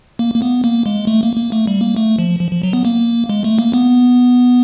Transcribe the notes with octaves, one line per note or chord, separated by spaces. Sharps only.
A#3
A#3
B3
A#3
G#3
A3
A#3
A#3
A3
G3
A#3
A3
F3
F3
F3
F#3
B3
A#3
G#3
A3
A#3
B3